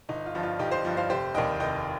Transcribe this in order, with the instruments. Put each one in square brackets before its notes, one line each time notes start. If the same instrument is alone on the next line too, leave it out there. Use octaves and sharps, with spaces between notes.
[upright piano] G1 D#4
F4
G2 F3
F4
G1 D#4 G4
C5 F5
G2 F3
C5 F5
F1 G4 C5
D#2 D#3 G3 D#5 G5
F1 D#5 G5